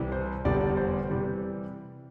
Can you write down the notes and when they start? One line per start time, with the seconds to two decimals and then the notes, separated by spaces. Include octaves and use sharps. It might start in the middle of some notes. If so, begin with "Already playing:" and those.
Already playing: C2 C3 E3 G3
0.12 C5
0.45 F1 E2 D3 G3 D5
0.61 D5
0.77 C5
1.10 C3 E3 G3